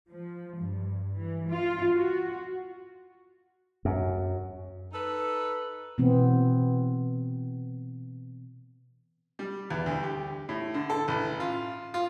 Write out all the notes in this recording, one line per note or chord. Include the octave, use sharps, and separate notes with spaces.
F3
G2
E3
F4
F#4
F#2
D#4 A4 B4
B2 E3 B3 C4
G3
E2
D2
G4
A2
D3
A4
A1
F4
F4